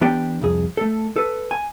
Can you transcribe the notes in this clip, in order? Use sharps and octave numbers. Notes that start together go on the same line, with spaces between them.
E3 B3 D4 G4 D5 G5
C2 F2 G#4
A3 A4
A4 B4
G#5